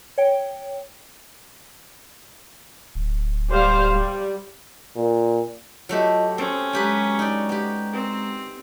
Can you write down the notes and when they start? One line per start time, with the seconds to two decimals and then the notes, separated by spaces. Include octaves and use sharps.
0.18 C#5 G5
2.95 D1
3.51 G3 C5 F5
3.94 G3
4.96 A#2
5.89 F#3 A3 F4 G4 D#5
6.38 C4 C#4 C5
6.73 F#3 G#3 G4 B4 A#5 C#6
7.19 D#4 D5
7.49 B3 G4
7.93 C4